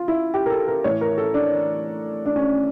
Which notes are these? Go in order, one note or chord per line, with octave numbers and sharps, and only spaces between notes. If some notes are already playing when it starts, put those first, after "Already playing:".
Already playing: F4
E4
G4
A#4
A4
A#4
A2 E3 C#5
A#4
A4
D4
D4
C#4